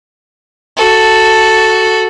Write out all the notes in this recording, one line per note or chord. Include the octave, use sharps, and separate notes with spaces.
F#4 A4